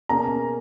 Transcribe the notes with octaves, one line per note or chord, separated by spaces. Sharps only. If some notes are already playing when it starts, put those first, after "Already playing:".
B2 A#3 C#4 G#4 A#5